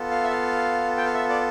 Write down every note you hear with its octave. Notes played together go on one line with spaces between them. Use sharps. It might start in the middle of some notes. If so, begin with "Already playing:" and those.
Already playing: B3 F4 A4
F5
E5
F5
G5
F5
E5
D5